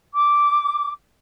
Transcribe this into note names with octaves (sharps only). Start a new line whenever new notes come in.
D6